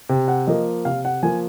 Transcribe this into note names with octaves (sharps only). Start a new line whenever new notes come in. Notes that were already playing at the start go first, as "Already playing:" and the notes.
C3
F#5
F3 A#3 D#5
C3 F5
F#5
F3 A#3 G#5